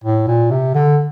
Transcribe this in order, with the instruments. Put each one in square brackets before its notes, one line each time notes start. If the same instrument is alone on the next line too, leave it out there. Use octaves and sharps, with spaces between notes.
[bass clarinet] A2
A#2
C3
D3